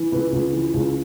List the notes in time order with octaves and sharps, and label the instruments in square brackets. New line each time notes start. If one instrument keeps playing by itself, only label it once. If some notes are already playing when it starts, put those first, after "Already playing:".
Already playing: [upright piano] E3
C#2 B4
C#2 B4
E3
C#2